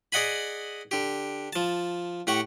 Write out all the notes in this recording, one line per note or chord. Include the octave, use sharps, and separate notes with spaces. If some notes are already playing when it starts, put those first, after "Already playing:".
G#4 D5 D#5 F#5 G#5 B5
D3 G4
F3 A5
A2 G4 F#5 C#6